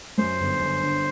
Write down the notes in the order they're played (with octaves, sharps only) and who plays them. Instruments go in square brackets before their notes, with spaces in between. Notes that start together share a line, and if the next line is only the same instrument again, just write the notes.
[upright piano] F#2 [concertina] C5
[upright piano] G1
G1
D3